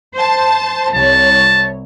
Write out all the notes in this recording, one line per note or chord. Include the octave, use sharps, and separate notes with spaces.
C5 A5
C2 C#5 A5